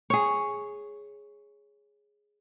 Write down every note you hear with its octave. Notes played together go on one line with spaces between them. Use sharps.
G#4 C#5